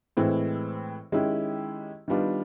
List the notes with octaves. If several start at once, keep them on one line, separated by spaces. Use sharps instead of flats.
A2 E3 G#3 C4 E4
D#3 G#3 C#4 E4 G4
D#3 G3 B3 D4 F4